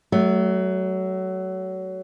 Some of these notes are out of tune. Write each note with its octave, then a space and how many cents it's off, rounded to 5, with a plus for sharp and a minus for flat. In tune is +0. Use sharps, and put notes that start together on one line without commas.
F#3 +25 A3 -15